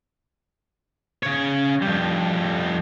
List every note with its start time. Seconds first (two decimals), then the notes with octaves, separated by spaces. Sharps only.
1.23 C#3 C#5
1.82 F2 G3